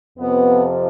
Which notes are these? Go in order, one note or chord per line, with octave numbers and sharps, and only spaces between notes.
F2 C3 F3 B3